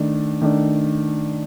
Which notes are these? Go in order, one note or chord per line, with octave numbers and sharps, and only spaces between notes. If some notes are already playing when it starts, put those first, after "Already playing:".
Already playing: D#3 A3 D4
D#3 A3 D4